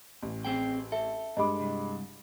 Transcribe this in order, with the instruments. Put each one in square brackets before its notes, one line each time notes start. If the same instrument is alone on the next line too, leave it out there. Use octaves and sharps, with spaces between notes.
[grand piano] A1
[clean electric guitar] C4 G#4 G5
[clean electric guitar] A4 [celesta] E5
[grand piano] G2 G#3 D6 [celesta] D#5 B5
[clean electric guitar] C2